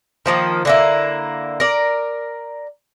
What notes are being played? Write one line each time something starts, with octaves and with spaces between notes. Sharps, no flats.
D#3 F3 A#3
D3 A#3 E4
A#4 D5